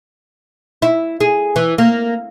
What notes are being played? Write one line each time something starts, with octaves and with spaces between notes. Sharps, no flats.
E4
G#4
E3
A#3